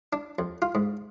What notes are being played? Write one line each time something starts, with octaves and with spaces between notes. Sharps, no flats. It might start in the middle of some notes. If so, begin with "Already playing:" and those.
D4
F2
F4
G#2